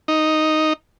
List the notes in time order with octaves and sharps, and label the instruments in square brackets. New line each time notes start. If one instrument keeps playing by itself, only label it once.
[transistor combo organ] D#4